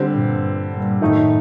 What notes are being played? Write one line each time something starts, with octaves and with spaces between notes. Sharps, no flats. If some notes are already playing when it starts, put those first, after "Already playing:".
Already playing: D3 G3 C4
G2 A#2
G2 A#2
F#2 A2 D#3 A3 D#4